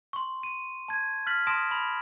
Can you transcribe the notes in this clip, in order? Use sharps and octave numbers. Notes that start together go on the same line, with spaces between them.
C6 C#6
D#7
A5 G#6
F6 F#6 A6 B6 F#7
A5 C6 D#6 A#6 D7 E7
B5 F#7